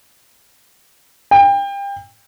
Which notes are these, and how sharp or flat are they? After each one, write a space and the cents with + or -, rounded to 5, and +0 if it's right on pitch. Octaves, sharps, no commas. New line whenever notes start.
G5 +30